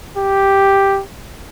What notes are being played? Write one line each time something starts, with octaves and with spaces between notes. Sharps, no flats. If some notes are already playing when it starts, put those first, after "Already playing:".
G4